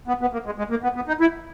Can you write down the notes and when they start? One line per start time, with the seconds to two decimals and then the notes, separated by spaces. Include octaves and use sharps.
0.08 B3
0.21 B3
0.33 A#3
0.46 G#3
0.58 G#3
0.70 A#3
0.83 B3
0.95 B3
1.08 D#4
1.21 E4